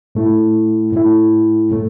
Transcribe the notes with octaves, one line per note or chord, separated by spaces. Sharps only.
A2 A3 E4
A2 A3 E4
A2 A3